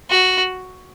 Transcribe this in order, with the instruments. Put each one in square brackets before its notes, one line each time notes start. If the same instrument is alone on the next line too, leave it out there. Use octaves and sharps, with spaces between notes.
[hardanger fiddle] F#4